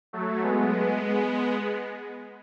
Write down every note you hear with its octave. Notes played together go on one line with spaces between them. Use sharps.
F#3 A3
G#3 B3